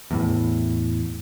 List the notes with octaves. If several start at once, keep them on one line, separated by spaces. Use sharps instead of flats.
E2 A2